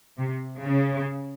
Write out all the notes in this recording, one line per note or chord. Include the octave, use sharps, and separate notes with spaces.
C3
C#3